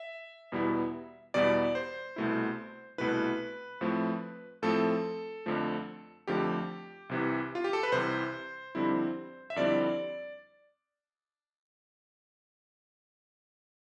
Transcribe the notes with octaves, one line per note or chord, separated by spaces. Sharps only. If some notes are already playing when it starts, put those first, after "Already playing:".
Already playing: E5
E2 B2 G3 B3 E4
E2 B2 G3 B3 E4 D5
C5
C2 B2 A3 E4
C2 B2 A3 E4 B4
A2 F3 A3 C4
A2 F3 A3 C4 A4
F2 D3 F3 A3
F2 D3 F3 A3 G4
C2 C3 E3
F4
G4
A4
B4
C2 C3 E3 C5
F2 D3 G3 C4 E4
E5
F2 D3 G3 C4 E4 D5